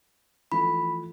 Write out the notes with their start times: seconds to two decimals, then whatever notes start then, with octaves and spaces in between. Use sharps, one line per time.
0.52 E3 F3 A3 B5